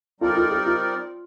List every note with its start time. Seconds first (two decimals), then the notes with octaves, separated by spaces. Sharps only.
0.21 G3 C4 D#4 F4 A4 A#4 D5
0.35 F4 A4
0.51 G4
0.66 F4